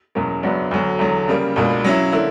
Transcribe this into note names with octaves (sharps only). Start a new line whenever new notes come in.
E2 B2 F#3 A#3 C#4
F#2 C#3 F#3 B3 D4
D2 D3 F#3
E2 D3 F#3
C#3 G3 A#3
C#2 B2 A#3 D4
F#3 C#4 E4
D3 A#3 E4